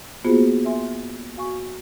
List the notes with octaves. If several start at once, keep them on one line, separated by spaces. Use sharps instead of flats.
A#3 B3 F4 F#4 G#4 C5
E5 G#5 C6
F#4 F5 G#5 C#6